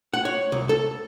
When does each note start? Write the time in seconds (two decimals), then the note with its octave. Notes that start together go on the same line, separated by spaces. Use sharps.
0.13 F#5
0.25 C#5
0.52 C2
0.69 A4